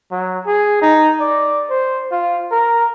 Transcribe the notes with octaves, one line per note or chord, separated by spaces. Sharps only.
F#3
G#4
D#4
D5
C5
F4
A#4